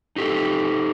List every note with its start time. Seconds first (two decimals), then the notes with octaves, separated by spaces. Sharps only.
0.16 D#4 G4 A4